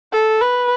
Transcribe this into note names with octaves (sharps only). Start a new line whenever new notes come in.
A4
B4